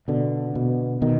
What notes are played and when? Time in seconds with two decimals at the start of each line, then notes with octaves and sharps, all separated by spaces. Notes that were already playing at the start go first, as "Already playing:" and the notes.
0.08 B2 D3
0.55 B2
1.02 B2 D#3